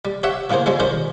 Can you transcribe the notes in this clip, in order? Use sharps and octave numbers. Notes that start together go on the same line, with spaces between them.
G3
G4 C#5 E5 F#5
A2 C#3 A#3 G#4 C5
C#3 F3 G3 G#3 G#4
D#3 G3 C#4 C5